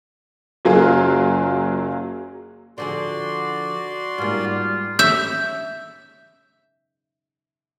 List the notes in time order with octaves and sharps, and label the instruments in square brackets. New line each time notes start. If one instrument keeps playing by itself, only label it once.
[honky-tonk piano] F#1 F#3 A#3 F4 G#4
[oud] D3 F3 G#4 [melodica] F#4 D5 C6
[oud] G#2 A#3 [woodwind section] G3 F4
[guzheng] E5 [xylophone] G6